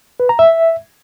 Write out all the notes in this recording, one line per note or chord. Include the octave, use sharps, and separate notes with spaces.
B4
A#5
E5